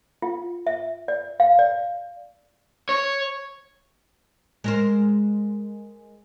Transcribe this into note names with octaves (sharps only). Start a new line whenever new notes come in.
F4
E5
D5
F5
D5
C#5
G#3 A#4 C5